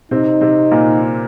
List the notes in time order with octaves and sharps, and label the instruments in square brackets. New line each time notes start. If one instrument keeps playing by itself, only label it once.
[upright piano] C3 C4 [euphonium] D#4
[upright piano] C3 C4
A#2 A#3